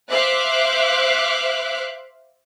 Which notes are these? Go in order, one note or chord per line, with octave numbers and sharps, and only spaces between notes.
C5 E5 F5 D6 F#6